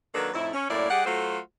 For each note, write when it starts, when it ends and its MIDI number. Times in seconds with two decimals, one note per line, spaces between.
0.14 0.29 51
0.14 0.29 54
0.14 0.29 58
0.14 0.29 62
0.14 0.29 69
0.14 0.29 71
0.33 0.48 41
0.33 0.48 45
0.33 0.48 63
0.33 0.48 64
0.53 0.66 61
0.69 0.89 42
0.69 0.89 45
0.69 0.89 58
0.69 0.89 64
0.69 0.89 74
0.90 1.04 55
0.90 1.04 67
0.90 1.04 68
0.90 1.04 78
1.05 1.39 54
1.05 1.39 57
1.05 1.39 65
1.05 1.39 66
1.05 1.39 69
1.05 1.39 72